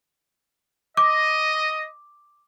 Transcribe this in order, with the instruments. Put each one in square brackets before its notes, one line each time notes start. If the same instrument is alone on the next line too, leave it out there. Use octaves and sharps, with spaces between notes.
[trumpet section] D#5 [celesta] D6